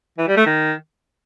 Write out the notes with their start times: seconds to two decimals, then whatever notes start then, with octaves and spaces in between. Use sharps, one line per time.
0.18 E3
0.27 G3
0.37 A3
0.46 D#3